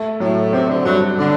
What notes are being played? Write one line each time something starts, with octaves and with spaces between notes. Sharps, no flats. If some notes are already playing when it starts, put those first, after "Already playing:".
Already playing: A3
A2 F#3
C3 C4
D3
G2 F#3
D3 D4